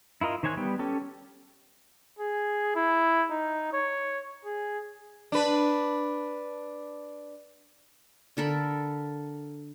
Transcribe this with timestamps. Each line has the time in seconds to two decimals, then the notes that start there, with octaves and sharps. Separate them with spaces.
0.21 E4 F4 A#4 D#5
0.43 D#3 C5 C#5 G#5 F#6
0.57 G3 B3 G5
0.79 C#4 G4 A4
2.19 G#4
2.76 E4
3.30 D#4
3.73 C#5
4.45 G#4
5.32 D4 B4
8.37 D3 A4 A#4 B5